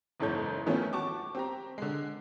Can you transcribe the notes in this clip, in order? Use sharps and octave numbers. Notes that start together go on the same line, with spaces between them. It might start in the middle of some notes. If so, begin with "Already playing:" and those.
F#1 E2 G#2 A4 C#5 G6
D#3 F3 A3 B3 C#4
F#4 A5 C#6 D6
C4 G4 A#5
D3 G#3